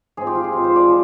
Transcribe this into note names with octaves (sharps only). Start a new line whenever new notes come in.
G#2 F3 C4 G#4
G4
F4
G#4
G#2 F3 C4
C5
D5
F3